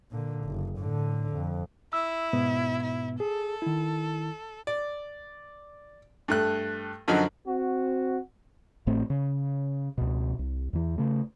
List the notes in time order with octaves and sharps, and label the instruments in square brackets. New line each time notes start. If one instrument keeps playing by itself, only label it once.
[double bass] A#2 D3
F#1
A2 D3
F2
[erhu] E4 [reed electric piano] E6
[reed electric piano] G#2 B2 B3
[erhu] E4
[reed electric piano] G#4 [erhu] A4
[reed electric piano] D#3 E4
[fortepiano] D5
G2 A3 F#6
F#2 D3 F3 F#3 D#4 F#4
[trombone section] C4 F#4
[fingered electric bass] A1 A2 A3 C4
C#3
C#2 B2
C2
E2 E3
C#3 A3